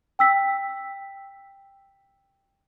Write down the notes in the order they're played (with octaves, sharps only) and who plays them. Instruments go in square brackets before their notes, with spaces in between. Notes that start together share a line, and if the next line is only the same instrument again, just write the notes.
[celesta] G5 E6 B6